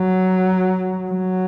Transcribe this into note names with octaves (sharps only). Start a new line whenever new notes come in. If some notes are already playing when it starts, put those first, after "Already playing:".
Already playing: F#3
F#3